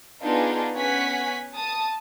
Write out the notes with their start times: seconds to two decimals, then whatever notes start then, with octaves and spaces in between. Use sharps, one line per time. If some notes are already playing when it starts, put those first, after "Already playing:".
0.23 B3 D4 D#4 F4 G#4
0.76 B3 C#4 C#5 F#5 G#5 B6
1.55 A5 D#6